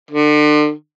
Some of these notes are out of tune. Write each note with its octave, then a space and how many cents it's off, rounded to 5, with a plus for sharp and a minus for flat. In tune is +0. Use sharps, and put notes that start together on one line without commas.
D3 +35